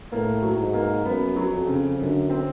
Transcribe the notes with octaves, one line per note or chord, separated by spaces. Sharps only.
A2 A#3
F#3
G#2
A#3
F#2 B3
F#3
F2
C#3
F#2 D3
C4